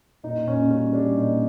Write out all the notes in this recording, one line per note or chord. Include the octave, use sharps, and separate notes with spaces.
A#2 D#4
A#2 C#4
G3 C#4
G3 D4
A#2 D#4